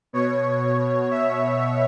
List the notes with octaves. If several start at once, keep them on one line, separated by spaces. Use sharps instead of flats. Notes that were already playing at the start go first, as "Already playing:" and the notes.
B2 C#5
E5